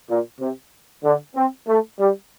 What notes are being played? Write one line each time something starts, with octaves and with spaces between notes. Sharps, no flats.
A#2
C3
D3
C4
A3
G3